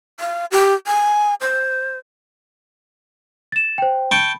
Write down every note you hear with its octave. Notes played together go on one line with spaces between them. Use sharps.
F5
G4
G#5
C5
A6 E7
C5 G5
G5 A5 B5 C#6